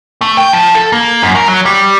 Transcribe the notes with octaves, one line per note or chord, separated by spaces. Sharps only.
A3
G5
F3
A4
A#3
F#2
A#4
F#3
G3